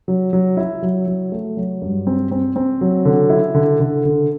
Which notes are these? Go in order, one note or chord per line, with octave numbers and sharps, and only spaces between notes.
F#3
F#3
E4
F#3
F#3
A3
F#3
G2
C4
C4
C4
F#3
D3
E4
D3
D3
D3